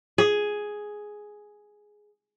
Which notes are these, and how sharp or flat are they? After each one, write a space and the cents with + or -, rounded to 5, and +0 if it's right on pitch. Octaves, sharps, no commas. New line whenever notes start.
G#4 +5